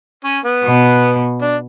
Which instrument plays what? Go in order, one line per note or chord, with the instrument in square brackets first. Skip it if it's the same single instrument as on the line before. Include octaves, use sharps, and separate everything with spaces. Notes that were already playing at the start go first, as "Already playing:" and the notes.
[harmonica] C#4
B3
[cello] B2
[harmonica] D4